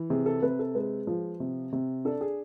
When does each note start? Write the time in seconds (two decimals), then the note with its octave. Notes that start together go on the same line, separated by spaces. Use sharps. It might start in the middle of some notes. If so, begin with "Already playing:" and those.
Already playing: E3
0.10 C3 G#4
0.26 A4
0.42 C3 B4
0.59 A4
0.75 G#3 B4
1.07 F3
1.40 C3
1.73 C3
2.05 D4 A4
2.21 G#4